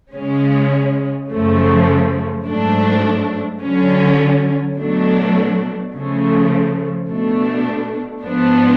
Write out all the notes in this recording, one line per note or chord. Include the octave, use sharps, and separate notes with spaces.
C#3 G#3 C#4
F#2 C#3 F3 A3
G#2 F#3 A3 D4
D3 F#3 C#4
B2 F#3 A3 D4
C#3 F3 A3
B2 A3 D4
G#2 F3 B3 D4